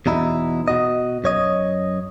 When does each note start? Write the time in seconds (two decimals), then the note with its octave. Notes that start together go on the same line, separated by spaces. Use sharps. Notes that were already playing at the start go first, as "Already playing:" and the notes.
0.06 E2 B2 D#4 E4
0.68 B2 F#4 D#5
1.24 F#2 C#5 D#5